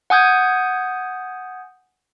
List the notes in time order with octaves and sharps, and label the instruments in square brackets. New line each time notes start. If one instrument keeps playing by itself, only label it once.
[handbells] F#5 G#5 D#6 G6 G#6